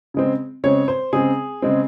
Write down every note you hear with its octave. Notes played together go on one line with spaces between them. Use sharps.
C#3 G#3 C4
C#3 G#3 C4 C#5
C5
C#3 G#3 C4 G#4
C#3 G#3 C4